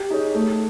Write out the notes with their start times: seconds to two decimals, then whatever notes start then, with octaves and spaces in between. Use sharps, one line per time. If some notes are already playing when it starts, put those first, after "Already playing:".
Already playing: G4
0.10 D#4 G#4 C#5
0.35 A3